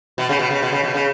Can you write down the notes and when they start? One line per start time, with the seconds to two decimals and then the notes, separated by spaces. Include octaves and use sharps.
0.18 B2
0.29 C#3
0.39 B2
0.51 C#3
0.62 B2
0.72 C#3
0.84 B2
0.94 C#3